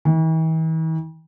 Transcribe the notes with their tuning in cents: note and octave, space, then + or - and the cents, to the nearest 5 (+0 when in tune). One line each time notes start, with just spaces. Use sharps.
E3 -45